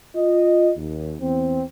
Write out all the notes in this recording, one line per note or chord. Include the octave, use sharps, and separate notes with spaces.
F4 D#5
D#2
E2 C4